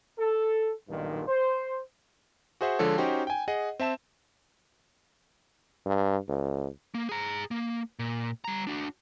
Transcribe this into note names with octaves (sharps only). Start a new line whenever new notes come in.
A4
B1 G2 A#2 D#3
C5
F#4 G#4 C5 E5 F#5
D3 F3 G#3 A4 C#5
C#4 D#4 F#4 G4 C5 G5
G5 G#5
G#4 D#5 F#5
C4 E5 A5 E7
G2
C#2
A#3
G#4 A#5
A#3
A#2
G3 A#5
D4 F#4